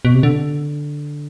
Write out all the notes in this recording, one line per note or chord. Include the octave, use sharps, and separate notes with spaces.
B2
C3
D3